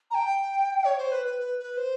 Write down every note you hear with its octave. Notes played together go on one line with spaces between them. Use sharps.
A#5
G5
C#5
C5
B4
B4
B4
B4
C5